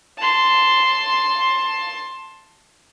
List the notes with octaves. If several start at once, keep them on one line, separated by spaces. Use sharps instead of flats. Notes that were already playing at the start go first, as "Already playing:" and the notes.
A5 C6